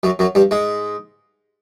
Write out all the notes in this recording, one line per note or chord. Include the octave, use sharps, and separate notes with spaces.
F#2 F#3
F#2 F#3
G2 G3
G#2 G#3